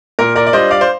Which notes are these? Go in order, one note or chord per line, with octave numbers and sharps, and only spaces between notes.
A#2 A#4
A#4 D5
D5
G3 D4 F4 C5 D#5
D5 F5
C5